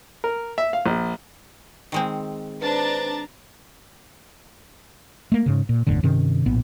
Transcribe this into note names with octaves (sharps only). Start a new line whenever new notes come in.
A#4
E5
F5
A#1
D#3 G#3 C4
D4 B4 C5 A5 A#5
A3 A#3
G#2 C#3
A#2
G1 E2 A2 D3
G2 C3 D#3 C#4
A#1 A2 B3